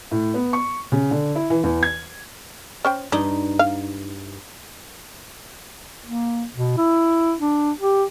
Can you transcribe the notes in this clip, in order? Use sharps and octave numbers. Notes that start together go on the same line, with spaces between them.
A2
B3
C#6
C#3
D3
E4
E3
E2
G#6
C#4 C5 G5
G2 D#4 D5
F5
A#3
B2
E4
D4
G4